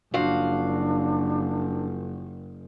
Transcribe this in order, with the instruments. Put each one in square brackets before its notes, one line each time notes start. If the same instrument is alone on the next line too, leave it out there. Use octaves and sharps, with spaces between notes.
[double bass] F#1 [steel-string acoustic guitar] F3 F#4 F5 [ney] D4